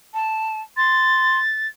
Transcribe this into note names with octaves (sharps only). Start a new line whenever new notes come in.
A5
C6 A6